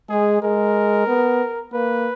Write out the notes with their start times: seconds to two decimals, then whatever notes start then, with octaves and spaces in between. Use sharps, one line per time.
0.09 G#3 G#4
0.42 G#3 A#4
1.08 B3
1.73 A#3 B4